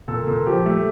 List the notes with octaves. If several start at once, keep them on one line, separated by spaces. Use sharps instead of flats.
A#2 A4
A#2
F3 G4
A3